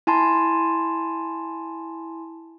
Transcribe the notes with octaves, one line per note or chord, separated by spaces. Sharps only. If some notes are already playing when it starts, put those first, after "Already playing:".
E4 G#5 A5 C6